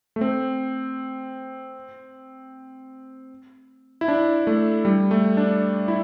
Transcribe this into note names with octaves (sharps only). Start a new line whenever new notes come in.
A3
C4
E4
D4
A3
G3
A3
D4
E4